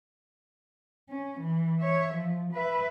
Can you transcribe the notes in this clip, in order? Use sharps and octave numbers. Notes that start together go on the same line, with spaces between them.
C#4
E3
C#5 E5
F3
B4 E5